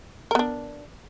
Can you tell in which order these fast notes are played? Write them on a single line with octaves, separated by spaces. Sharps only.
A#4 B3 D4